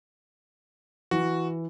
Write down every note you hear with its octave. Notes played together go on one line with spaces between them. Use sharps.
E3 F#4